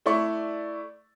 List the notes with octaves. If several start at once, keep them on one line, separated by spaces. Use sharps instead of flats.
A3 E4 D5 C#6